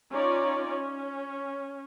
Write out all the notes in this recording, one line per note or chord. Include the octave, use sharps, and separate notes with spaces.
C#4 D#4 F4 C#5 D5
C#4